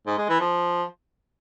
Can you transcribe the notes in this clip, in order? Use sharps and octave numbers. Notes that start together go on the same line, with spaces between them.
G#2
G#3
E3
F3